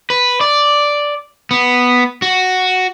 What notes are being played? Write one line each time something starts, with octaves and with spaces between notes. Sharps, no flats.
B4
D5
B3
F#4